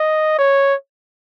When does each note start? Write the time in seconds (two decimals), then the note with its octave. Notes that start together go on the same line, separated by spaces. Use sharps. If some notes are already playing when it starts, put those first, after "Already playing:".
Already playing: D#5
0.39 C#5